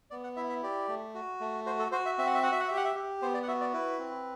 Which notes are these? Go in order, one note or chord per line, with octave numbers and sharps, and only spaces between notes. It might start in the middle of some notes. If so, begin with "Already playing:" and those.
B3 D5
F#5
E4 E5
E5
G4 D5
A3
F#4
A3
F#4 C5
A4
F#4 C5
E5
C4 E5
F#5
E5
F#4 F#5
E5
F#5
G4 E5
F#5
E5
G4
B3 C5
D5
F#5
F#4 E5
D5
E4 B4
C4